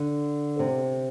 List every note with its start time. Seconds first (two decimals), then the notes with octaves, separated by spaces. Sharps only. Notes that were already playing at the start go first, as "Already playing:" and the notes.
Already playing: D3
0.59 C3